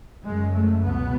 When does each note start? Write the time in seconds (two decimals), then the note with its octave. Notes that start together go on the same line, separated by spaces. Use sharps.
0.24 F#2 C#3 G#3
0.53 A3
0.84 C#2 B2 B3